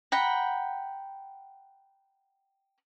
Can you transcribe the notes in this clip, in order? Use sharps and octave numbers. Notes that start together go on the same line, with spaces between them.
F#5 G5 A#5 B5